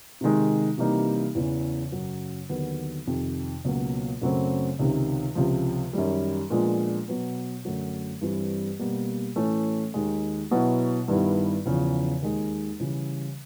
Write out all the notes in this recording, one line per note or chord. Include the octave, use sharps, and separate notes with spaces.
C3 D#3 G#3
C3 E3 G3 A#3 D#4
E2 C#3 E3
F#2 C#3 F#3
D#2 D3 F#3 B3
F2 C3 D#3
C#2 B2 F#3 A#3
F#2 C#3 F#3 A3 C4
C#2 C3 D#3
C#2 C3 F3
F#2 D#3 G3
A#2 F3 G#3 B3 D4
B2 F#3 B3
F#2 D3 F#3 A3
G2 E3 G3 C4
B2 G3 A#3
A2 E3 A3 C#4
D#2 D#3 G#3
B2 F#3 B3 E4
G2 D#3 G3 B3 E4
E2 C#3 F3
D#2 D#3 G#3
C#3 E3 G3